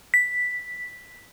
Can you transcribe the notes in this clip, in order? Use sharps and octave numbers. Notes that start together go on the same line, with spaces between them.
B6